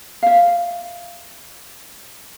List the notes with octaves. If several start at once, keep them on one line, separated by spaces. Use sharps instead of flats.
E5 F5